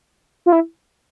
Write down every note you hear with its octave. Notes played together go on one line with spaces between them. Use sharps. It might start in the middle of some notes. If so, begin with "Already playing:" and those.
F4
E4